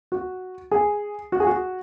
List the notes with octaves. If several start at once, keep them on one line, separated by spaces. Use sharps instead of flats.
F#4
G#4
F#4
G#4
F#4